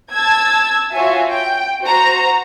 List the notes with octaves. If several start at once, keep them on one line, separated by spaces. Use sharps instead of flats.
A5 E6 G#6
F4 F#4 C#5 E5 G#5
G5
F#4 C5 A#5